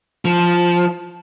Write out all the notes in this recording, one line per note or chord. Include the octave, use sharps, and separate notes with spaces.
F3